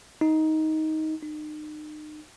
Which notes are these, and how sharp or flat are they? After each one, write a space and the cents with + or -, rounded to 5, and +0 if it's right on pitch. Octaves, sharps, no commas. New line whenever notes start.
D#4 +15
D#4 -35